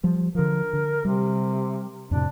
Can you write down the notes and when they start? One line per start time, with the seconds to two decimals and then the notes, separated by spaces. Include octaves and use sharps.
0.03 F3 G3
0.35 D3 F3 A#4
0.73 D3
1.05 C3 G3
2.11 F2 A2 C3 D4